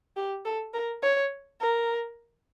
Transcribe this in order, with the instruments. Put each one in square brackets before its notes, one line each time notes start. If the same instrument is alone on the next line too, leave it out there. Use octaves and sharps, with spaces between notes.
[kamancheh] G4
A4
A#4
C#5
A#4